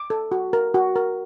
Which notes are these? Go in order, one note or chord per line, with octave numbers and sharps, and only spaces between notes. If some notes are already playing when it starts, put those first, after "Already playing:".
Already playing: D6
A4
F#4
A#4
F#4
A#4